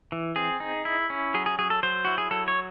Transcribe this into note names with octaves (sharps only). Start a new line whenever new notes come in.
E3
C4 G#4
D#4
E4
C#4
F#3 G#4
G#4
F#3 G#4
A4
F#3 C5
E4 F#4
G#4
F#3 A4
C#5